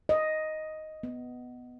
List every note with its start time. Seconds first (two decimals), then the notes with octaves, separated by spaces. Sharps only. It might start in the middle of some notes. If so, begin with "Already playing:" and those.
0.09 D#5
1.03 B3